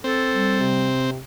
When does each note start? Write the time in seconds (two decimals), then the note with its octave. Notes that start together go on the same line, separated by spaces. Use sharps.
0.04 C4 A4
0.32 G3
0.60 C3